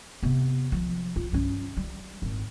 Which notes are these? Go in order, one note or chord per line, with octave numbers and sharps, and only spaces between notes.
C3 B3
F3
F4
G2 C#4
G3
G#1 A#2